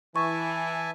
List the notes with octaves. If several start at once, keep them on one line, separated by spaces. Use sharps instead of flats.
E3 E5 G#5 A5 C#6